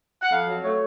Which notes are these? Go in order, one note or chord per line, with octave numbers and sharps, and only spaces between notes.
F#5
F2 F5
F#3
A3 C#5